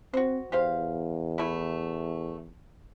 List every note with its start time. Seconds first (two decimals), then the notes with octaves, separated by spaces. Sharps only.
0.14 C4 F#4 C5
0.52 E2 G4 C5 F5
1.38 A3 E4